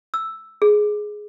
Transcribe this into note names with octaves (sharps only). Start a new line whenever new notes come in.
E6
G#4